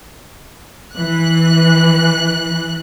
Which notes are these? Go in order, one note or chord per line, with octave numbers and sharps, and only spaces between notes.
E3 F#6